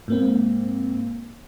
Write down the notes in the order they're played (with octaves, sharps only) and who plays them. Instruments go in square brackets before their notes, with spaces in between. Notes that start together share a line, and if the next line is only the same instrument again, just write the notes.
[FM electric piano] G#2 A#3 C4